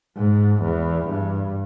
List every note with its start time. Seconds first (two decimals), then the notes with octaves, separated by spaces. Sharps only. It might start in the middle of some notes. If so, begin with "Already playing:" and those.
0.17 G#2
0.63 E2
1.09 G2